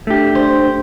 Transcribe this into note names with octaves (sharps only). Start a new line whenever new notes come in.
A3 D4 G4
C5